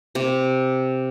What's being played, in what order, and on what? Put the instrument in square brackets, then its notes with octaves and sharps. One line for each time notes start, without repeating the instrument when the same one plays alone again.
[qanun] C3